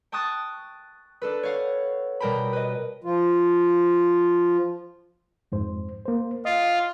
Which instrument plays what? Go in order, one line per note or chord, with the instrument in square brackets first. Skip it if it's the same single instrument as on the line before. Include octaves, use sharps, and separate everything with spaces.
[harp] G5 A5 C#6 D#6 F#6 A6
D4 A4 B4
C#5 F5 F#5
B2 G3 A#4 G5 A5 B5
B4 D#5
[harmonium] F3 F4
[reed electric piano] F2 G#2 C5
A#3 C5
[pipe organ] F4 [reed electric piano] D#5